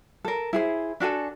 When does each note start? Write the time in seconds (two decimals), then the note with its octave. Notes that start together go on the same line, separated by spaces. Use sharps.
0.25 A4 A#4
0.53 E4 G#4 C5
1.00 D4 F#4 A4 G#5